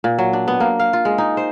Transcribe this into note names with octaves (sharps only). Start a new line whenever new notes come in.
A#2
F#3
D4
B3
A#3
F5
F4
G#3
D#4
C5